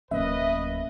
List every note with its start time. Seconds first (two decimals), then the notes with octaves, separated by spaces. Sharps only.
0.11 D1 F#3 A#3 B3 C#4 B4 D#5 E5